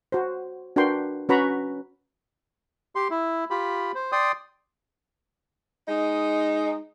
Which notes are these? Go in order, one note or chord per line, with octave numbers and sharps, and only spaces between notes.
F#4 C5
D4 F#4 A#4 B4 G5 C6
C#4 F#4 B4 A#5 B5 C#6
G4 C6
E4
F4 G4 B5
C5
D5 G5 C6 D#6
G#3 D#4